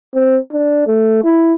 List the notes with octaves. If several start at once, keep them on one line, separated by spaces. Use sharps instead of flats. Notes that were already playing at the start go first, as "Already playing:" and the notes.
C4
D4
A3
E4